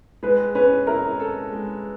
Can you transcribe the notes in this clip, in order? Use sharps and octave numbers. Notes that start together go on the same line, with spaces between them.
G#3 B4
C#4 B4
E4 A#4
A4
G#3